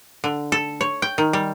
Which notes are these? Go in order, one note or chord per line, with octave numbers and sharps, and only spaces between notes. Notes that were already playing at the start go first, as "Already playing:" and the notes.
D3
A4
C#5
G5
D#3
G3